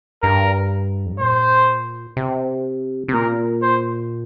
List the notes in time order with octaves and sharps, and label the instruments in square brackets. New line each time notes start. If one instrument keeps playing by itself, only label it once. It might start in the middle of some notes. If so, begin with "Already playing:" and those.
[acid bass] G2 [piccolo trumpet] A#4
[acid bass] F2
G2
[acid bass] A#2 [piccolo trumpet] C5
[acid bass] C3
C3
[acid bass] A#2 [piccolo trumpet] A#4
[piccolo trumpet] C5